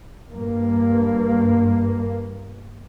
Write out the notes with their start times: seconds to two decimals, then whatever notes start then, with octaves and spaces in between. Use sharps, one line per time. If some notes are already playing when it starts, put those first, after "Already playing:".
0.34 G2 A#3